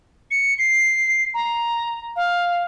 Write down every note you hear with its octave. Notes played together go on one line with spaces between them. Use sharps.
C#7
C7
A#5
F5